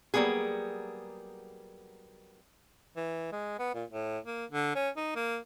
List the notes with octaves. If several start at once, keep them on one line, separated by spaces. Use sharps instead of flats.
F#3 G3 A#3 B3 G#4
E3
G#3
B3
A#2
A2
A#3
D3
C#4
D#4
A#3